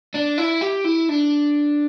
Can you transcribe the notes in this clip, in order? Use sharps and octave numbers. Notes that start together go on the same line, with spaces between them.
D4
E4
G4
E4
D4